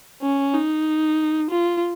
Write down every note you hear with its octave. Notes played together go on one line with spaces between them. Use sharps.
C#4
D#4
F4